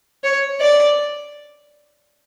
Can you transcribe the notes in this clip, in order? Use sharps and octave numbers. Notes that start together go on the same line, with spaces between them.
C#5
D5